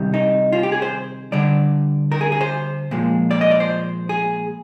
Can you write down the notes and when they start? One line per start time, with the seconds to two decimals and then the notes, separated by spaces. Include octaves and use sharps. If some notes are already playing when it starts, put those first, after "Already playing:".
Already playing: C3 D#3 G3
0.14 D#4
0.52 F4
0.63 G4
0.72 G#4
0.82 C5
1.32 D3 G3 D5
2.12 A#4
2.21 G#4
2.32 G#4
2.41 C5
2.91 A#2 F3 G#3
3.31 D5
3.41 D#5
3.51 D5
3.60 C5
4.09 G#4